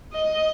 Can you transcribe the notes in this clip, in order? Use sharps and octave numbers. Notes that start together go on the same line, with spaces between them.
D#5